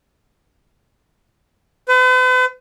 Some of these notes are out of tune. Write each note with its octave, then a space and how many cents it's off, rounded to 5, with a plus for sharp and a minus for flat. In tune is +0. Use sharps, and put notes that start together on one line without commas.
B4 +45